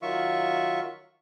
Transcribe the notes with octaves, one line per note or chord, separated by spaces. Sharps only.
D#3 F#3 F4 E5 C#6